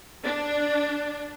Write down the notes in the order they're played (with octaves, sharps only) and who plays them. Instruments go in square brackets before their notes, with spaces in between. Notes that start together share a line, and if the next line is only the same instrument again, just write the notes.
[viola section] D4